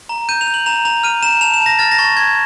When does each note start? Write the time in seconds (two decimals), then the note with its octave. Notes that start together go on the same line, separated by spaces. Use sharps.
0.09 A#5
0.29 G6 D#7
0.41 F7
0.47 G6
0.54 F#7
0.66 A#5 F7
0.85 A#5 F7
1.03 F6 D#7
1.23 A#5 E7
1.41 A5 F7
1.54 E7
1.61 A5
1.66 A#6
1.79 F6 A6
1.92 A#6
1.98 C#6 A6
2.17 C#6 G#6